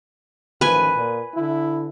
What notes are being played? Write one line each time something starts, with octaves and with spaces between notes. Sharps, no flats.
A1 D#3 F3 B4 G#5
A#2
D3 E4